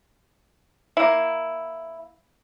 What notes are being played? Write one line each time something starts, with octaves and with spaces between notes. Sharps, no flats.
A#3 E4